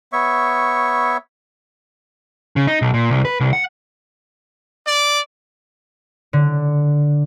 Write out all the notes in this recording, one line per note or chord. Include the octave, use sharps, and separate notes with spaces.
B3 C#5 E5 C#6
C#3
D#4
B1
A#2
C2
B4
C2
F#5
D5
D3